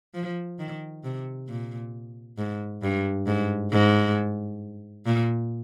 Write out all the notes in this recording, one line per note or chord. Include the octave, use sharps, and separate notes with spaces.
F3
D#3
C3
A#2
G#2
G2
G#2
G#2
A#2